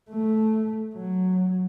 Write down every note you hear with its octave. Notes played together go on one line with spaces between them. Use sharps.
A3
F#3